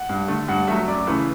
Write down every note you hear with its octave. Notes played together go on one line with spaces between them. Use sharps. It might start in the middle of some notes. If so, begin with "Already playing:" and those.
Already playing: F#5
G2
D3 A3
G2 F#5
F#3 A3 E5
F#2 D5
C#3 E3 A3 B4